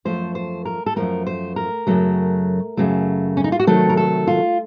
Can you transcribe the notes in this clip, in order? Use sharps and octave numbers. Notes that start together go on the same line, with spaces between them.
F#2 F3 A3 C5
C5
A#4
A4
F#2 F3 A3 A#4
C5
A#4
F#2 C#3 F#3 A3
F#2 C#3 F#3 A3
C#4
D#4
F4
F#4
C3 D#3 F#3 A3 A4
A#4
A4
F4